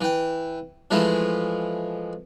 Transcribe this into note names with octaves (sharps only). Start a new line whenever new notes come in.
E3 G5
E3 F3 G#3 A3 E4